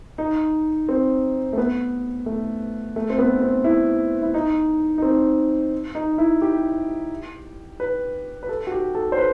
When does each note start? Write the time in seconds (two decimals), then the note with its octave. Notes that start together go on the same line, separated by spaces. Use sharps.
0.18 D#4
0.89 C4
1.53 A3
1.58 B3
2.26 A3
2.96 A3
3.10 C4
3.19 B3
3.41 C4
3.64 E4
4.22 E4
4.34 D#4
4.98 D#4
5.02 C4
5.95 D#4
6.18 E4
6.41 G4
7.80 B4
8.43 B4
8.49 A4
8.67 F#4
8.72 G4
8.95 A4
9.12 C5
9.18 B4